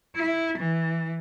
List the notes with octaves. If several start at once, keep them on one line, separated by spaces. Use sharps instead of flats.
E4
E3